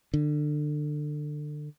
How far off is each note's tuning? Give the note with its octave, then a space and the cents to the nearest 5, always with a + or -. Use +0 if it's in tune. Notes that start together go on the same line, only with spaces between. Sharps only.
D3 +25